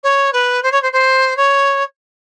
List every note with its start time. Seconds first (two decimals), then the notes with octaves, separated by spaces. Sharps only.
0.03 C#5
0.33 B4
0.63 C5
0.72 C#5
0.82 C5
0.92 C5
1.37 C#5